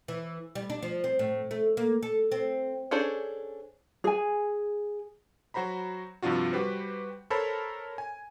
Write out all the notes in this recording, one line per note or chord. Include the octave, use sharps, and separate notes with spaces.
E3
G3
D4
F3
C4
A2
A3
A#3
A4
C4
C#4 D4 G#4 A4 C5
G#4 G#5
F#3 F#4 C5 A#5 B5
G2 C3 F3 D4 F4 F#4
G3 F#4 G4 B4 C5
A4 A#4 C5 C#5 A5 B5
G#5